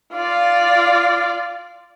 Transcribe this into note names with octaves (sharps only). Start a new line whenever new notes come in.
F4 D5